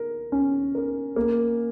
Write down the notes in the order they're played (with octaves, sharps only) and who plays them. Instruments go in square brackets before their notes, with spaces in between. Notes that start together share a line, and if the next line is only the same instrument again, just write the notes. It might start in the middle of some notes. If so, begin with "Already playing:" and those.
Already playing: [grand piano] A#4
C#4
A#4
A#3